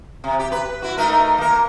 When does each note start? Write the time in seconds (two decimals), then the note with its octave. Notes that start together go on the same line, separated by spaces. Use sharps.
0.24 C3
0.39 G4
0.52 B4
0.82 E4 F#4
0.98 A3 D#4 A#4
1.38 A#3 A#4